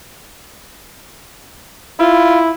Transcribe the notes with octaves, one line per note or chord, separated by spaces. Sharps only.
E4 F4